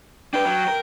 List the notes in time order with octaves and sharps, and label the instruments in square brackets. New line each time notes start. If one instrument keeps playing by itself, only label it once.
[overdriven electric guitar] D4 B4 [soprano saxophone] G5
[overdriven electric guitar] F#3
A#4